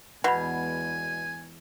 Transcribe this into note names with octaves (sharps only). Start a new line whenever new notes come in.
E2 B2 G#3 F#5 G#5 B5